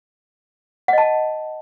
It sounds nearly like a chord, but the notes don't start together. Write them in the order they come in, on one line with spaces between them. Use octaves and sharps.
F#5 D#5 A5